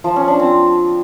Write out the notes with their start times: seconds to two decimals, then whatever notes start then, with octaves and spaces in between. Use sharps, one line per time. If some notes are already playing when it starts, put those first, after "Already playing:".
0.04 F3
0.16 C#4
0.28 D4
0.40 C4